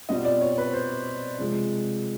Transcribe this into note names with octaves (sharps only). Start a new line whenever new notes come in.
B2 G3 C4 F4 D#5
D5
C#5
B4
C5
C3 F3 G#3